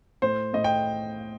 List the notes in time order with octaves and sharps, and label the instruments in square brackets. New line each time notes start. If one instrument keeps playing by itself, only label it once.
[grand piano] A2 C5
A2 D#5
G5